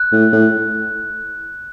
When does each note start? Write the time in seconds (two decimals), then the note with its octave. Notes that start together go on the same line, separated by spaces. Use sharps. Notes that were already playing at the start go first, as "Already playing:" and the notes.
Already playing: F#6
0.12 A2
0.33 A2